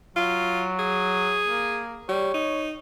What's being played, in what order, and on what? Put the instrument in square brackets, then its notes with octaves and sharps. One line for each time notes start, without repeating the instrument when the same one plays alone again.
[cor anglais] F#3 [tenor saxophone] F4
[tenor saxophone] G#4
[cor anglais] A#3
[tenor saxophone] G3 [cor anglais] C#5
[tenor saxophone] D#4